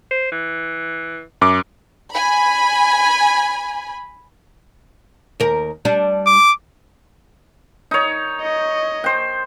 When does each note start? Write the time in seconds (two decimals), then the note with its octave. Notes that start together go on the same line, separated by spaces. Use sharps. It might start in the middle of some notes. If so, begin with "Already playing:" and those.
0.11 C5
0.32 E3
1.41 F#2 D6
2.12 G#5 B5
5.40 D#2 A#4
5.85 G3 D4
6.27 D6
7.91 D#4 C#5
8.42 D#5
9.04 C5 G5